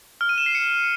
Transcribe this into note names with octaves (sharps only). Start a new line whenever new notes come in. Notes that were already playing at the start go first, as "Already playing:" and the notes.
F6
D#7
E7
C7
C#7